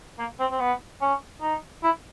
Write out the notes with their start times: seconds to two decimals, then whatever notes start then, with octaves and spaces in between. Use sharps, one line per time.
0.19 A#3
0.40 C4
0.51 C4
0.60 B3
1.01 C#4
1.42 D#4
1.84 E4